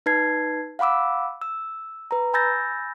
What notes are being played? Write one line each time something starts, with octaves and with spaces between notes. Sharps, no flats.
D#4 B4 A5 G#6 C7
F5 F#5 B5 D6 E6
E6
B4 A#5
G#5 B5 E6 G6 A6 A#6